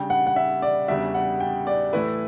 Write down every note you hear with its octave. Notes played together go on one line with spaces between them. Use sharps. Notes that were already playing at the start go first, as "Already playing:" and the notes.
Already playing: C#3 G3 D4 G5
F#5
F#5
E5
D5
E2 C#3 G3 D4 F#4 E5
F#5
G5
D5
A2 E3 A3 E4 B4